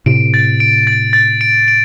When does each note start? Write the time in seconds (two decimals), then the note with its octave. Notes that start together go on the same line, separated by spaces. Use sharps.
0.06 A2 C3 D7
0.34 A6
0.60 D7
0.87 A6
1.13 A6
1.41 D7
1.68 D7